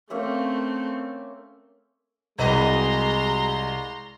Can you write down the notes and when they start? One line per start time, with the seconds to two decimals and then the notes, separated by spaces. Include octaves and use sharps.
0.10 A3 A#3 C4 C#4 E5
2.38 C2 G#3 F#4 B4 D#5 A#5 C6